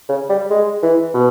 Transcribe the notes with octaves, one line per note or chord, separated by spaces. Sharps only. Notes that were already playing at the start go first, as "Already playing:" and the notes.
C#3
G3
G#3
E3
B2